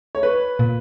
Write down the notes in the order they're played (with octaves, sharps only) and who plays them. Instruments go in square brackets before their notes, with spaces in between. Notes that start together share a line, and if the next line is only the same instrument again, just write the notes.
[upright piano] C#5
B4
[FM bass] A#2